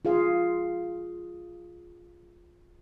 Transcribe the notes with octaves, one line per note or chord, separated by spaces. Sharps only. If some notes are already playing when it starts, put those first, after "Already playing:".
F4 G#4 F5